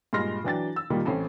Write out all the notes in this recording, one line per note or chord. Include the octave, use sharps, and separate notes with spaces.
G2 A#2 G#3 C6 F6 A#6
E3 F#3 D4 G5 A6
E6
A#2 D#3 G3 A#3
A1 C4 C#4 A4